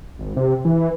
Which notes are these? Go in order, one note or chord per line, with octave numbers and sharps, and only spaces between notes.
G#1
C3
E3